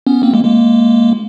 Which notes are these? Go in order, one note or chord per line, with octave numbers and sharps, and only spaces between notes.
B3 C#4
A#3 C4
G#3 A#3
G#3 A#3